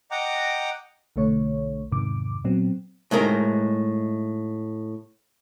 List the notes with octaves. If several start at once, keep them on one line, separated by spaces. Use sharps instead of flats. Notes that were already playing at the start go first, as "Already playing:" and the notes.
D#5 F#5 G5 A#5 D6
B1 D3 A3 C#5
E2 G#2 C3 D#3 D6
A#2 F#3 B3 C4
A2 G#3 D#4 A#4 C5